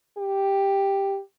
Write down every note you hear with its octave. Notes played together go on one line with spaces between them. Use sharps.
G4